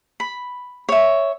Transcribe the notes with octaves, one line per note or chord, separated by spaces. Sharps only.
B5
C#5 E5